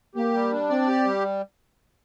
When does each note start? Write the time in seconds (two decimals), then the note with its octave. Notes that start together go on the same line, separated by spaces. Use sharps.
0.15 A#3 G4
0.34 G3
0.51 D4
0.69 C4 D5
0.87 G4
1.05 G3